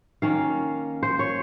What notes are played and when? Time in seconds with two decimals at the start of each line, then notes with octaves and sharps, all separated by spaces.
0.22 D#3 A#3 C#4 F5
1.03 C5
1.19 C#5